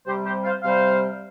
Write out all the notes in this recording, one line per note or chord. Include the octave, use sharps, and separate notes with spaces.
C3 G3 G4 C5
G4 C5
C5 F5
C3 G3 C5 F5